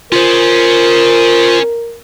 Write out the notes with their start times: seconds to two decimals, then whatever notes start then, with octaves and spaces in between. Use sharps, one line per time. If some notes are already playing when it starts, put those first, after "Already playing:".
0.12 C#4 F4 G#4 A#4 C5